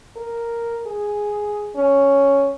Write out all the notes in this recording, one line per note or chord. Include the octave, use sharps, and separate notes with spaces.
A#4
G#4
C#4